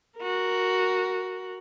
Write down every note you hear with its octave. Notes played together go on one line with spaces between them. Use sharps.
F#4 A#4